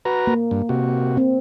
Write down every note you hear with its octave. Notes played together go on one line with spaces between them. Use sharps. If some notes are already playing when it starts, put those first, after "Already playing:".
F#4 B4 A#5
A#3
G2
C3 F#4
C4